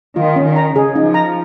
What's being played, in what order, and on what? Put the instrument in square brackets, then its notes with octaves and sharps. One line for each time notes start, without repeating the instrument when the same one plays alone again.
[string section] D#3 [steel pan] F4
[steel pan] C#4
[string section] D#3
[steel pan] A#5
[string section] C#3 [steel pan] G#4
[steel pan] D#4
[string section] F3
[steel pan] A#5